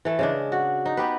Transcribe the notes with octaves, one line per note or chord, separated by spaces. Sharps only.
E3 A3
C#3 G#3 D4
F#4
D#4
B3 G4 B4